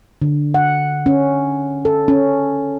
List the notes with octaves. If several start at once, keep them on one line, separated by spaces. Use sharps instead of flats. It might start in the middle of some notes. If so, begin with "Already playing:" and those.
D3
F#5
C#4
A4
C#4